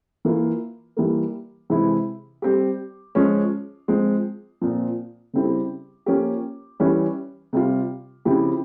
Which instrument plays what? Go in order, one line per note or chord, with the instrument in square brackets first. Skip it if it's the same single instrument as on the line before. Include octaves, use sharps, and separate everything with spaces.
[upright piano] E3 A#3 F4
E3 G3 A#3
C3 E3 G#3 C4 E4
G3 C4 G4
F3 G#3 C#4
F3 G#3 C4
A#2 F3 C4
C#3 G3 C4 E4 G4
F3 A#3 C#4 G4
E3 G3 C#4
C3 G3 C4 F4
C#3 F3 C4 E4 G4